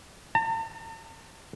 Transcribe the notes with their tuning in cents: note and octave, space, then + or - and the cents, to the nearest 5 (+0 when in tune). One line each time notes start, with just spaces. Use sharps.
A5 +45